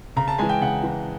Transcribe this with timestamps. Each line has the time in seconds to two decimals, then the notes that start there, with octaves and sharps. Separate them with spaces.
0.16 C#3 A#5
0.28 A5
0.38 E3 G#3 G#5
0.49 G5
0.61 C#3 F#5
0.83 E3 G#3